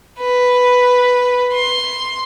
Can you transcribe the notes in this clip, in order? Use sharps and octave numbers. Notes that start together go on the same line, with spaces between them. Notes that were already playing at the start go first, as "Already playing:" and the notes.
B4
C6